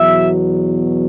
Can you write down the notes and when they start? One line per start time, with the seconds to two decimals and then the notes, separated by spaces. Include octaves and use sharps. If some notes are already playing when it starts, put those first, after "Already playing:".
Already playing: E2 B2 F#3 E5